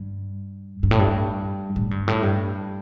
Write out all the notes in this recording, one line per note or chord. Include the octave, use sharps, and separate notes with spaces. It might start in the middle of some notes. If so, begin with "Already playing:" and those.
Already playing: G2
G2
A2
G2
A2
G2
A2
G2